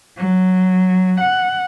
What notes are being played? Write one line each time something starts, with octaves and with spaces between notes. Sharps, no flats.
F#3
F#5